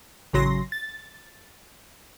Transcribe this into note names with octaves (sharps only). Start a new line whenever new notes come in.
A1 C#3 F#3 C6 A#6
A6